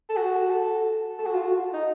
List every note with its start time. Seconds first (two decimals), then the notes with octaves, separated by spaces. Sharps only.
0.09 A4
0.17 F#4
0.50 A4
1.18 A4
1.26 F#4
1.34 F4
1.42 F#4
1.73 D#4